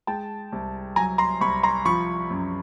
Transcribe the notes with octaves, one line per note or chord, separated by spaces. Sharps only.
G#3 G5 A5
C2
F#3 G#5 A#5
A#5 C6
C2 B5 C#6
A#5 C6
F3 B5 C#6
F#2